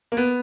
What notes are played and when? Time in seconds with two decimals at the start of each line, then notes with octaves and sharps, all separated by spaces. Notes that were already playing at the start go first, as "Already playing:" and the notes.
0.12 A#3
0.17 B3